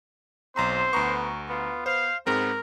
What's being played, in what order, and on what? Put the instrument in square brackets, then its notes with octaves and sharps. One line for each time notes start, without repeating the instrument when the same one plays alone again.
[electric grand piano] B1 A#5 C6 [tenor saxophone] C4 [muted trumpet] C5
[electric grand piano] D2 A#5 C#6 [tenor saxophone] B3
[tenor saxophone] B3 [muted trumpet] F4
[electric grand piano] C5 [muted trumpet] F5
[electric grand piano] G#2 G#3 C4 [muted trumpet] B3 [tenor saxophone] A#4